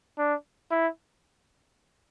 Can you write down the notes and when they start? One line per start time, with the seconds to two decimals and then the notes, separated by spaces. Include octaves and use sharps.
0.18 D4
0.71 E4